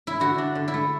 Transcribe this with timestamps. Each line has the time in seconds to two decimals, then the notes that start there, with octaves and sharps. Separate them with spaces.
0.07 E4
0.20 D3 F#4
0.38 D4
0.55 D3
0.68 E4
0.74 A3